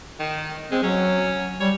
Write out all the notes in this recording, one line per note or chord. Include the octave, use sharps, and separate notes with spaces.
D#3
G#3 C4
F#3 C#4
G3 C#5